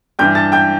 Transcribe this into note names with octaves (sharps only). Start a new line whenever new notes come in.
G2 E3 G5 G6
A5 A6
G5 G6